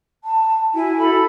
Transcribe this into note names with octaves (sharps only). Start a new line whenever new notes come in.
A5
E4 F#4 G#5
A4 E5 B5